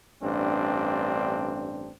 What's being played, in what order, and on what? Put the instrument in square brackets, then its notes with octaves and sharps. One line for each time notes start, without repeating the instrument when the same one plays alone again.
[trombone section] A1 G2 C4 D4